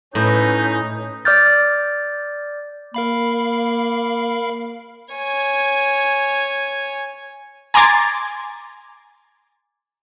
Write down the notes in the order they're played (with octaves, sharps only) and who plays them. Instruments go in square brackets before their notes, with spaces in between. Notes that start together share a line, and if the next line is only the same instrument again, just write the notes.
[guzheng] A2 [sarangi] C#4 [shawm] D#4 [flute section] B4 G6
[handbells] D5 D6 F6 G6 A6
[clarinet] A#3 [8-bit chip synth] A#4 F5 B5
[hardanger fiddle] C#5 G#5
[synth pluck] G#5 A#5 C6 D6 G#6 A6